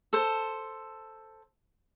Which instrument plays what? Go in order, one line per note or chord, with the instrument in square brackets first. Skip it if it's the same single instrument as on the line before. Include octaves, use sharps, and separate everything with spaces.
[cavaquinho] A4 C5